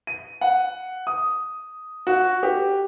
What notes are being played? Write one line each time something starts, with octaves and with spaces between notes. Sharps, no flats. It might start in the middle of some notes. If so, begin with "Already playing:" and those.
D#7
F#5
D#6
F#4
G4